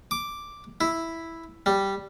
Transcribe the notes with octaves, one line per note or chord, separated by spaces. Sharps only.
D6
E4
G3